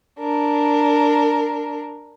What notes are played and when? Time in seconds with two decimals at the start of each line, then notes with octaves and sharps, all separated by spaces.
0.19 D4 A#4